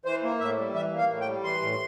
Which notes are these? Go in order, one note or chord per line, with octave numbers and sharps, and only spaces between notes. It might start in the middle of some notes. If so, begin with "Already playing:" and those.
E3 C5
A#3
A2 E5
G3
E3 E5
A#3
F5
A2
G5
G3
E3 C6
A2